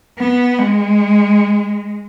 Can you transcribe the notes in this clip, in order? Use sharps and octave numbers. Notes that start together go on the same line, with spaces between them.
B3
G#3